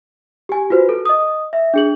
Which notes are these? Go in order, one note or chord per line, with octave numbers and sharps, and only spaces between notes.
G4 G#5
F4 F#4 B4 C5
A4
D#5 D#6
E5
D4 G#4 F#7